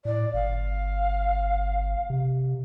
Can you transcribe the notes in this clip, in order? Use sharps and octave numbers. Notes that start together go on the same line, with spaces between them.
A2 D5
G1 F5
C3